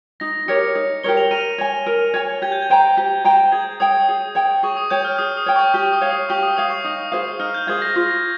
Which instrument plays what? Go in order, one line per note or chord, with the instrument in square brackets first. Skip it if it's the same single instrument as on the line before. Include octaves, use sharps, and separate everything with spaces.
[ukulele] D#4 [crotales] A#6
[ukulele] G4 A#4 C#5 [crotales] C#7
[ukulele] D#4
[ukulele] G4 A#4 C#5 [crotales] G7
[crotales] F7
[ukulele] A#4 [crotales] D#7
[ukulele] C#5 G#5
A#4
C#5 G#5
[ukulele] G4 [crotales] G#6
[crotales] G6
G#6
[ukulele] C5 G5 A#5
G4
C5 G5 A#5
[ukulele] G#4 [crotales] G#6
[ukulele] C#5 G5 [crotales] D#6
[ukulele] G#4
C#5 G5
[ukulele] G#4 [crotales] C#6
[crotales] D#6
[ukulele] C#5 G5 [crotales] G6
[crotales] F6
[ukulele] G#4 [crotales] D#6
[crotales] D#6
[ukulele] C#5 G5
[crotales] C#6
[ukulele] G4 [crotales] C#6
[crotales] D#6
[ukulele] C#5 F5
[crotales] D#6
[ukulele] G4 [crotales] C#6
[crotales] D#6
[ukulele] C#5 F5 [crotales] D#6
[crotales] C#6
[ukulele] D#4 [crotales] D#6
[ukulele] G#4 C5 F5 [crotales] D#6
[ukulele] D#4 [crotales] F6
[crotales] G6
[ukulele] G#4 C5 F5 [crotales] G#6
[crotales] A#6
[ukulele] F4 [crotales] A#6